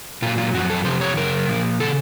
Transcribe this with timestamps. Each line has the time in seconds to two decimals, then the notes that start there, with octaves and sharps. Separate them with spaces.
0.22 A#2 F#3 F4
0.38 F4
0.54 F#2 F3 F#4
0.70 A4
0.85 F2 C3 F3 C5
1.01 C#5
1.17 F#2 C#3 A#4
1.48 A#2 F3
1.80 C#3 A4